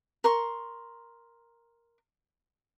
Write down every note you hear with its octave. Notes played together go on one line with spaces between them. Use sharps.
A#4 C6 C#6